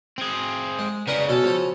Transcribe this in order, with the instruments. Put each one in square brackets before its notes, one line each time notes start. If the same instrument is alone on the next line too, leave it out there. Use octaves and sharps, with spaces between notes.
[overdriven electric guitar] C4 G#4
[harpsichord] G#3
[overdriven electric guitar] C#3 A#4 [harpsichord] B4 D#5 F#5 [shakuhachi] D5
[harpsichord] B1 C#4 [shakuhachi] F#4 [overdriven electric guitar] A4
[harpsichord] C#3 F3 C#5